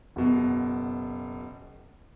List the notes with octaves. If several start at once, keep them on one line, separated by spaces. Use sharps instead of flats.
F#1 B2